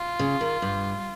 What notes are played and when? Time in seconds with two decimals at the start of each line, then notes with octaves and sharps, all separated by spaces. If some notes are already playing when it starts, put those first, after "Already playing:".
Already playing: F4
0.19 C#3
0.41 D#3
0.62 G2